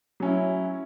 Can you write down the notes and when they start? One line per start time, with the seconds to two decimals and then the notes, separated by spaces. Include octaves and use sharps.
0.20 F#3 C#4 E4